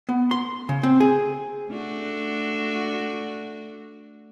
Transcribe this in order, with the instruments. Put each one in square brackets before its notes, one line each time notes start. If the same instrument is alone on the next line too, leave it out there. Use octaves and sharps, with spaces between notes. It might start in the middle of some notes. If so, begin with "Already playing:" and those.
[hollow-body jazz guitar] B3
C6
C#3
C4
G#4
[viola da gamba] A3 D4 F#4